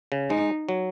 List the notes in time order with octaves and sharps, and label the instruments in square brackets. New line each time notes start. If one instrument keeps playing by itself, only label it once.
[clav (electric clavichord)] C#3
[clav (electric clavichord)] G#3 [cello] D#4
[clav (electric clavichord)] F#3